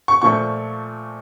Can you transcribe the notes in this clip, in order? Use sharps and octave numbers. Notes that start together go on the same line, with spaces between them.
C#6
A#2 F3 A3 C#6